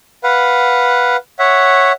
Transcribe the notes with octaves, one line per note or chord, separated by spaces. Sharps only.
B4 F5 F#5
C#5 E5 F#5